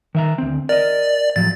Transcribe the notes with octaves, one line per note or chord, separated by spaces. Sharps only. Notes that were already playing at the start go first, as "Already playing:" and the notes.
D#3 E5 A#5
D2 C4
A#4 D5 D#5
A2 F3 F#3 A6